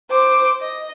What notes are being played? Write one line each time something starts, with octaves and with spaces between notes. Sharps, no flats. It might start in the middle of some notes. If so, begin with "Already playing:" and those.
C5 D6
D#5